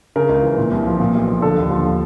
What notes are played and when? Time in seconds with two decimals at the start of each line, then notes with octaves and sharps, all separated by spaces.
0.16 C#3 A#4
0.29 C#2
0.43 E3
0.57 A#2
0.71 C2
0.87 F3
1.00 A#2
1.15 B1
1.28 F3
1.42 D3 A4
1.58 D#2
1.71 F3